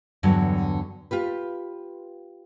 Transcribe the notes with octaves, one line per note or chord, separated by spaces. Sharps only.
E2 G2 D3 F#3
F4 G4 B4